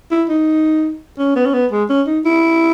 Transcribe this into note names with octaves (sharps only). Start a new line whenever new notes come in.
E4
D#4
C#4
B3
C#4
B3
G#3
C#4
D#4
E4